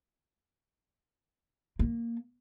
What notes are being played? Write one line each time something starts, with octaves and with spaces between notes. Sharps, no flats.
A#3